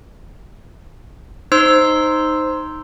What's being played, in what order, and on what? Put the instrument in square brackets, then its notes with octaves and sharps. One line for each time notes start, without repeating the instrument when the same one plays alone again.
[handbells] D#4 C5 C6 E6